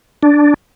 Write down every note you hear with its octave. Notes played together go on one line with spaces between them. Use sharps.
D4